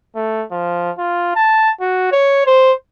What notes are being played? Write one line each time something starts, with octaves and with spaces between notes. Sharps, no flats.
A3
F3
F4
A5
F#4
C#5
C5